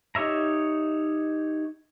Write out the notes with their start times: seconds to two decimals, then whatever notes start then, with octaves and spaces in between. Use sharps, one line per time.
0.15 D#4 G4 C#5 E5 A#5